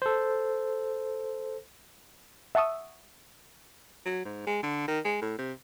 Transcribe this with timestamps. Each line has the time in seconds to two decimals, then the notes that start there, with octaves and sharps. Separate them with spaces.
0.02 A4 C5
2.55 E5 F#5 A5 C#6 D#6 E6
4.06 F#3
4.25 G#2
4.47 G#3
4.63 D3
4.88 D#3
5.05 G#3
5.21 A2
5.38 C3